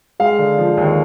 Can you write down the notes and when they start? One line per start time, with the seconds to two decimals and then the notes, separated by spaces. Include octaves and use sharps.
0.20 G#3 F5
0.39 D3
0.58 F3
0.77 D#2